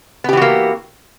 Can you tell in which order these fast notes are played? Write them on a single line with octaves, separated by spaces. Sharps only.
B3 G4 E3 F#4 A#3